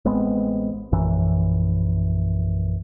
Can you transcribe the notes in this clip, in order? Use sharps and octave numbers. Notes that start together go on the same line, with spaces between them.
A1 G#3 B3 C4
A#1 F#2 E3